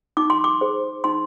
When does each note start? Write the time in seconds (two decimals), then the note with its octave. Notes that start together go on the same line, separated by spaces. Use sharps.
0.17 D#4 D6
0.30 C6
0.44 D6
0.61 G#4 C5
1.04 D#4 C6